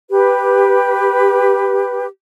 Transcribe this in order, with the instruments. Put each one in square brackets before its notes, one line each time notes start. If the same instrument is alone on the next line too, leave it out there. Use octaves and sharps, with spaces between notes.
[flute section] G4 B4